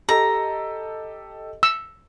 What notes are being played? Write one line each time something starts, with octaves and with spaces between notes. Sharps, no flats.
G4 A4 D#5 A#5
E6